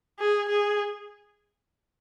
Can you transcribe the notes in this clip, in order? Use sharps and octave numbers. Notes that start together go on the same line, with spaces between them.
G#4
G#4